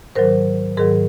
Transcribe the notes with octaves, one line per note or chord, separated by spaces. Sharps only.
G#2 D#3 F#3 A#4 C5
G#2 D#3 F#3 G#4 A#4